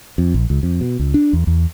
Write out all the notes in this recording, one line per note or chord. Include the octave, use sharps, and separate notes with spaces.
F2
A#1
C#2
F2
B2
C#2
D4
E2
E2